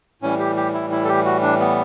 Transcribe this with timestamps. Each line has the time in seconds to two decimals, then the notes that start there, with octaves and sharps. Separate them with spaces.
0.22 A2 E3 G3 C#4
0.39 G4
0.57 G4
0.74 E4
0.92 E4
1.05 A4
1.08 G4
1.25 F#4
1.43 D4
1.60 B3